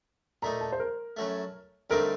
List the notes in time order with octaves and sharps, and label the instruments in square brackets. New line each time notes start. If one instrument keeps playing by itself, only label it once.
[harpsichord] A#2 A3 D#4 [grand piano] A#5
[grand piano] A5
C5
A#4
[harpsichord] F#2 F#3 A3
[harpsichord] G2 D3 A3 C4 D#4 [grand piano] A#4